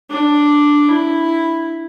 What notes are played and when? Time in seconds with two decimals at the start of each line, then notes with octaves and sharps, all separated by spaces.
0.10 D4
0.89 E4